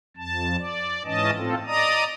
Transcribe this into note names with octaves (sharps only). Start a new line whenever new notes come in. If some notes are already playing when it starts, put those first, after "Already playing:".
F2 A5
D5
G#2 E3 C#4 D#5 A5
A2 C4 F4 A4
D5 D#5 A#5 D#6